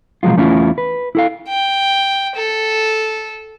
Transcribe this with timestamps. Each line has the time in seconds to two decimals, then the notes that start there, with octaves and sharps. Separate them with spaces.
0.23 B2 F3 F#3 G#3 F4
0.37 E2 A3 C#4 E4 F4
0.78 B4
1.15 E4 A4 F5
1.48 G5
2.36 A4